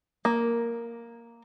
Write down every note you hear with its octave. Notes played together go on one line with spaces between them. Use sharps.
A#3